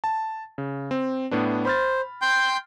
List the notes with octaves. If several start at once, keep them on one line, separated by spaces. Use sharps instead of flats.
A5
C#3
C4
A2 B3 D4
C5 B5 F6 A6
G5 C6 G6